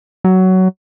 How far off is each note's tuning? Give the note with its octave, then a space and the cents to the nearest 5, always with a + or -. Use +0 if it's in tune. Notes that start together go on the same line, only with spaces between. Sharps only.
F#3 +15